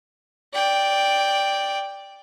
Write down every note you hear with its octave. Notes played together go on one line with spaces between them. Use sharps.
D5 G5